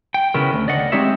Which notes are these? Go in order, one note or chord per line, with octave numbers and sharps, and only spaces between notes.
G5
C#3 B3 C#4 E4 A#4
D2
D5 D#5 F#5
G#3 C4 D#4 G4 C#5 E5